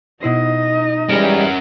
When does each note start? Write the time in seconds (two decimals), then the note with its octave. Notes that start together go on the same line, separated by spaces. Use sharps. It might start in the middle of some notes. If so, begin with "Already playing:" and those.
0.23 B2 D#4 E4 C5 D#5
1.10 E3 G3 G#3 C#4 A#4